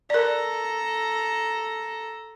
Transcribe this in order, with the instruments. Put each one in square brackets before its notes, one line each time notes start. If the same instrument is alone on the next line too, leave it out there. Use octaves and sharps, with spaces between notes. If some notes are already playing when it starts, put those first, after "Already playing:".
[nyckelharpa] A4 A#5 [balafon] A#4 D5